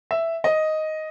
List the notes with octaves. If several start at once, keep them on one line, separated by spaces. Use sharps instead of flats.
E5
D#5